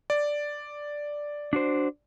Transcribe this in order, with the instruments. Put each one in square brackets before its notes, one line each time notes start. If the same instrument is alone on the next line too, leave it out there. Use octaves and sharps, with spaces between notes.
[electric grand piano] D5
[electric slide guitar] D4 F#4 C5